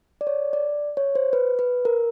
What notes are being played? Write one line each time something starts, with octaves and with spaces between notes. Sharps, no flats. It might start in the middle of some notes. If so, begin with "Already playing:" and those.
D5
C#5
D5
C#5
C5
B4
B4
A#4